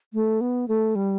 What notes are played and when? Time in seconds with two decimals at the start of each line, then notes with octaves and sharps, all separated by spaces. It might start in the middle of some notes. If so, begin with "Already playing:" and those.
0.14 A3
0.41 B3
0.68 A3
0.95 G3